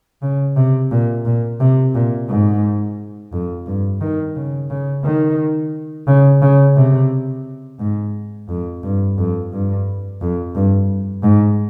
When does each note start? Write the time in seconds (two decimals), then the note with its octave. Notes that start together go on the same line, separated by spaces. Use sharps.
0.22 C#3
0.56 C3
0.91 A#2
1.25 A#2
1.60 C3
1.94 A#2
2.29 G#2
3.32 F2
3.66 G2
4.01 D#3
4.36 C#3
4.70 C#3
5.04 D#3
6.07 C#3
6.42 C#3
6.76 C3
7.79 G#2
8.48 F2
8.83 G2
9.18 F2
9.52 G2
10.21 F2
10.55 G2
11.23 G#2